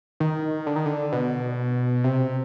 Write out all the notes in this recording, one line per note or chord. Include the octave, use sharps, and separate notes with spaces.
D#3
D3
D#3
D3
B2
C3